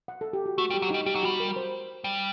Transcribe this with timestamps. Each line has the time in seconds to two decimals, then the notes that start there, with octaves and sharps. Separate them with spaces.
0.08 F#5
0.21 A4
0.33 G4
0.46 F#4
0.58 A3 F#4
0.70 G3
0.74 G4
0.82 F#3
0.90 G3 D#4
1.06 G3 G4
1.15 F#3
1.23 G3 F#4
1.40 A#4
1.56 C5
2.04 G3